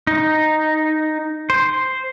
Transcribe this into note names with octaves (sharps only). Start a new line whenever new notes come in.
D#4
C5